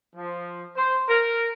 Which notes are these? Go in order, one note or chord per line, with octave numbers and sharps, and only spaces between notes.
F3
C5
A#4